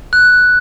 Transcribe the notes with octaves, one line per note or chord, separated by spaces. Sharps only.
F#6